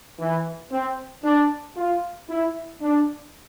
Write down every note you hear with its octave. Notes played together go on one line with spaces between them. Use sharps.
E3
C4
D4
F4
E4
D4